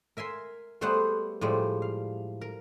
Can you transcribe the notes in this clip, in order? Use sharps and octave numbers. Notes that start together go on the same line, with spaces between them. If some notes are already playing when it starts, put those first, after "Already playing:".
A#4 E5 G#5 C6
G3 A3 B3 G#4 C5 F#5
A2 F3 G3 G#3
F5
A#4